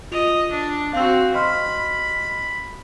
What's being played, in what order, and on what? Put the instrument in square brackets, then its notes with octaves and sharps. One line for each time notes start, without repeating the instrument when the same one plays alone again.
[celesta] F4 F7 [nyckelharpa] D#5
[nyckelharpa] D4
[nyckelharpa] C4 F#4 [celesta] F5 E6
[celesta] D#5 C6 F6 [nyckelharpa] B5